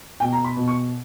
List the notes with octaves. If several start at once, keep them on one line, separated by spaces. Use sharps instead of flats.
B2 G5
A#5
B5
B2
C#6